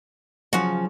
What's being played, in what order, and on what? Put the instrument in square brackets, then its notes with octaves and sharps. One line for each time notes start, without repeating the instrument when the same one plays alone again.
[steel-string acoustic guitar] C#3 F3 [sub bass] F#3 [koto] F#4